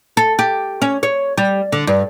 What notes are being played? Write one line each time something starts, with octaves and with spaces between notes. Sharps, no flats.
A4
G4
C#4
C#5
G3
D3
G2